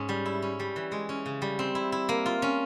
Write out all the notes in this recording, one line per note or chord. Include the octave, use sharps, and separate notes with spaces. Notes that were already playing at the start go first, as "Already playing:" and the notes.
Already playing: G#2 C#4
G3
E4
C#4
G3
E3
G#3
C#4
C#3
G3
C4
E4
E4
A#3
F4
C#4